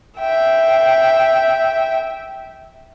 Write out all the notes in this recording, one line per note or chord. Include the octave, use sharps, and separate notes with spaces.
E5 G5